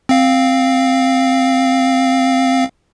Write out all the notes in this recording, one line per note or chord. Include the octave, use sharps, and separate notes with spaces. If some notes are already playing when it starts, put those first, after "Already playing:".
C4 F5